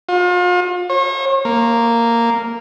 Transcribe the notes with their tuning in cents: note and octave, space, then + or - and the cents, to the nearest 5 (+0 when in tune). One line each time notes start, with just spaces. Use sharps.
F4 +40
C#5 -40
A#3 -5